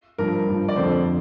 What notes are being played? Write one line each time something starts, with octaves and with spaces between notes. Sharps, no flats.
G2 F3 A#4
G2 F3
D5
F2 D3 F3 C5